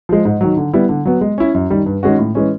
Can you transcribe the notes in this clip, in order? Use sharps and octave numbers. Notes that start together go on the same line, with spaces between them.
F3 G#3
G#2
D#3 F#3
D3
G3 B3 E4
D3
F#3 B3
G#3
C#4 E4
F#2
D#3 G3
G2
D#3 G#3 C#4 F#4
A2
E3 G#3 C#4